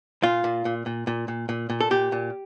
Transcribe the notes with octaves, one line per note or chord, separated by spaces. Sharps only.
A#2 F4
A#2
A#2
A#2
A#2
A#2
A#2
A#2
A4
A#2 G4
A#2